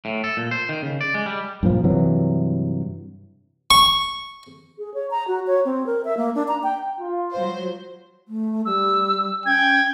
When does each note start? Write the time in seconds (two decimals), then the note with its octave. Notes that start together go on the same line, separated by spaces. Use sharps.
0.05 A2
0.24 A4
0.37 A#2
0.51 C5
0.69 D#3
0.82 C#3
1.01 D5
1.14 G#3
1.26 G3
1.63 G2 A#2 F3
1.84 G2 C3 E3 F#3
3.71 C#6
4.78 G#4
4.94 C#5
5.11 A#5
5.28 F#4
5.47 C#5
5.65 C4
5.86 A#4
6.05 E5
6.17 A#3
6.35 D4
6.48 A#5
6.63 G5
6.99 F4
7.34 F#3 C5
8.28 A3
8.65 G3 E6
9.46 C#4 G5 G#6